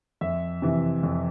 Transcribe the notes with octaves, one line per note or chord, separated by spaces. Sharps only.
F2 E5
C3 E3
F2